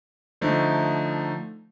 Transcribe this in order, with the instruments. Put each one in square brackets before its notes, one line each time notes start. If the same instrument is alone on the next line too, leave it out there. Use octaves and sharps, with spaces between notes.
[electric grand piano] D3 F3 A3 D#4